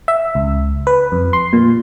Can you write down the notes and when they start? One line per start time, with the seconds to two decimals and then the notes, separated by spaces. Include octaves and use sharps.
0.08 E5
0.35 C#2
0.87 B4
1.12 F2
1.33 C6
1.53 A#2